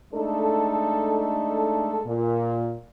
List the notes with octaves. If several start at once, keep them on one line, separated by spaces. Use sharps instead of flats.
G#3 A3 D4 D#4 A4
A#2